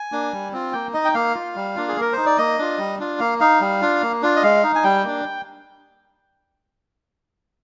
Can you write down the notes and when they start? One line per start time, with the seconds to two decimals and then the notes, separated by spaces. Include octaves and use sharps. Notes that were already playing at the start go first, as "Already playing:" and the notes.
Already playing: G#5
0.12 A#3 D4
0.33 G3
0.53 C4 F4
0.73 A#3 G5
0.93 D#4 D#5
1.05 G5
1.14 A#3 F5
1.35 F4
1.55 G3
1.75 A#3 D4 F4
1.88 G#4
1.96 A#3 A#4
2.13 D#4 C5
2.26 D5
2.38 A#3 D#5
2.58 D4 F4
2.78 G3
2.99 D4 F4
3.19 A#3 F5
3.40 D#4 F5
3.61 G3
3.82 D4 F4
4.02 A#3
4.22 D4 F4
4.36 D#5
4.43 G#3 F5
4.64 D#4
4.75 G#5
4.84 G3 G5
5.04 A#3 D4